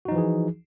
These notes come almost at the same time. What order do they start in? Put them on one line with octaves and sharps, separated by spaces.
F#4 D#4 F3 E3 G#4